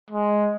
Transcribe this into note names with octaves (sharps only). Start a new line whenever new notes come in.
G#3